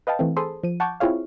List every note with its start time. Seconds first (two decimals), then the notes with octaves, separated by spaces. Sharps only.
0.07 B4 D#5 F5 G5 A5
0.19 E3 A3 C4
0.37 G#4 A4 C5 B5 C6 D#6
0.63 F3 D#7
0.80 F#5 A5 C#6 D6 G6 G#6
1.00 C4 E4 F4 G#4 C#5 F5